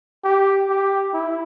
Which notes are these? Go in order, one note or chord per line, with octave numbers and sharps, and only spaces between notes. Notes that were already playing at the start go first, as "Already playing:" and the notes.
G4
G4
E4